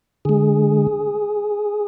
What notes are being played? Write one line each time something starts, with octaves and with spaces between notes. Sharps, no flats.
D3 G#3 G#4